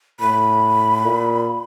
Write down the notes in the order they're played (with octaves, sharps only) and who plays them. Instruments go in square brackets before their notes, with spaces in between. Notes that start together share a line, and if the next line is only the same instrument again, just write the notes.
[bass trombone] A2 [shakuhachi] B5
[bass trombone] A#2